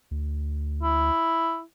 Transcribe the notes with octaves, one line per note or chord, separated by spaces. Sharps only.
D2
E4